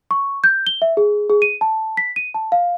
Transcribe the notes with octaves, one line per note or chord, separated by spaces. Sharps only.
C#6
G6
G7
E5
G#4
G#4
D#7
A5
B6
D#7
A5
F5